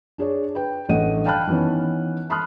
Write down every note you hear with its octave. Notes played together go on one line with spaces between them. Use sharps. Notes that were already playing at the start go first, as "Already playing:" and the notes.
D4 G#4 C#5 D5
B4 G5
A1 G2 A3 D#5 F#5 D#7
F5 G5 A5 B5 F6 F#6
D#3 E3 B3 C#4
A5 B5 C6 D#6 F6 F#6